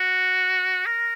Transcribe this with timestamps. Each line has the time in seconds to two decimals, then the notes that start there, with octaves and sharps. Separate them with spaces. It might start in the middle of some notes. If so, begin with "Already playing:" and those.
Already playing: F#4
0.86 A#4